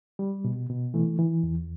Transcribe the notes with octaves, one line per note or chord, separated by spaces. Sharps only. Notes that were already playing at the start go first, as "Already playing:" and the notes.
G3
B2
B2
E3 A3
E3
E2